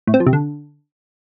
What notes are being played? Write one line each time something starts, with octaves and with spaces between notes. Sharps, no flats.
A2
C4
F3
C3
D3